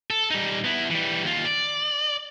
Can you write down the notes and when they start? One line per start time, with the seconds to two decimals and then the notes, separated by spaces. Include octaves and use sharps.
0.10 A4
0.30 G3 D#4
0.65 B3 E4
0.90 E3 G3
1.24 D#2 F4
1.45 D5